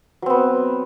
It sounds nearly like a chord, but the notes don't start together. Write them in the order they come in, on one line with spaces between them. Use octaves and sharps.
F#3 C4 B3